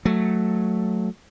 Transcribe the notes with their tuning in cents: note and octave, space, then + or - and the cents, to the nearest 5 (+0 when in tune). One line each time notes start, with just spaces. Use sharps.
F#3 +0 A3 +0